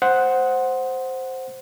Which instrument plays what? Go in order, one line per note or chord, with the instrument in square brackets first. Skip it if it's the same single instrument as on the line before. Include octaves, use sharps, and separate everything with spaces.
[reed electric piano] C5 F#5